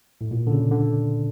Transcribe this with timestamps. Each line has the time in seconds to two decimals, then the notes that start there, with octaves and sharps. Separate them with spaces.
0.21 A2
0.31 A#2
0.47 D3
0.51 C#3
0.71 D3